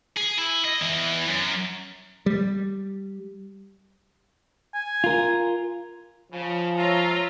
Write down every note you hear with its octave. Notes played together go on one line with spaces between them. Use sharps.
G#4
E4
D#5
E2 E3
F#2
G3
G#5
F4 A#4
C#3 F3
F4 C#5 E5 A#5